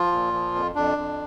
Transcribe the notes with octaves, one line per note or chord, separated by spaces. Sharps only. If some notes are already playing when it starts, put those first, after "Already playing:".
Already playing: F3 F4
A#2
F3
F2
F2 D4
F2